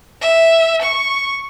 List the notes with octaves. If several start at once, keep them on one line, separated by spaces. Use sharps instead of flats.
E5
C#6